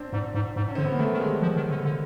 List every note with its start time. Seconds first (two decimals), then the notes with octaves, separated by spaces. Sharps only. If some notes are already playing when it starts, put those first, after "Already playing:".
Already playing: C4 D4
0.12 G#2
0.34 G#2
0.56 G#2
0.68 C#4
0.75 D3 C4
0.84 B3
0.91 A#3
0.99 D#3 A3
1.13 D#3 G3
1.20 G#3
1.42 F3
1.56 D#3
1.70 D3
1.85 D3